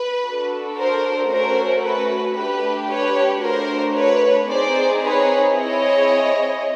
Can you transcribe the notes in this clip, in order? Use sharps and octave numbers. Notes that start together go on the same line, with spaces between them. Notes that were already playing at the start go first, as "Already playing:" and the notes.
Already playing: B4
D4 F#4 A4
A#4 C5
A3 C#4 F#4 A4 A#4 C5
B4
A3 D4 G4 B4
B4 C#5
A3 D4 F#4 A#4 C5
B4 C#5
C4 D#4 G#4 C5 D5
B4 C#5
C4 E4 G#4 C#5 D#5